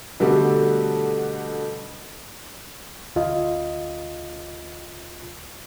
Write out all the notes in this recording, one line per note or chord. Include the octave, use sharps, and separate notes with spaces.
B2 D3 G3 A3 A4
D2 F4 D#5